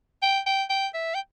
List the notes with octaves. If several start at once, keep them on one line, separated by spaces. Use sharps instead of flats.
G5
G5
G5
E5
G5